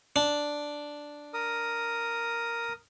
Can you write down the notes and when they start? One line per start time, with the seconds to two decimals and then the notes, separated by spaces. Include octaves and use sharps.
0.16 D4
1.34 A#4 D#6